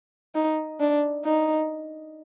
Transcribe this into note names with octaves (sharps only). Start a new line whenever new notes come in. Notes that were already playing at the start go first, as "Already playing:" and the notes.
D#4
D4
D#4